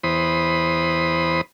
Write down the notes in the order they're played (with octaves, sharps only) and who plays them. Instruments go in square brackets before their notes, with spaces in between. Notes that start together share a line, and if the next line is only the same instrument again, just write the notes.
[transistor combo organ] E2 C5 B5 D#6